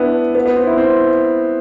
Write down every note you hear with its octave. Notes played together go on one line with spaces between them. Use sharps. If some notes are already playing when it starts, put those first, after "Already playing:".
Already playing: B3 D4 E4
B3
B3
C4
E4
C4